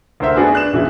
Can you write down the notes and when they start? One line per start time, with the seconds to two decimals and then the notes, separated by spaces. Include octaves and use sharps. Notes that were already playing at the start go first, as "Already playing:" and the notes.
0.20 D2 A#4 C5 E5
0.36 A3 B3 D4 F#4 G#4 B4
0.53 D4 F#6 E7
0.73 D#1 C#3 E3 F#4 E5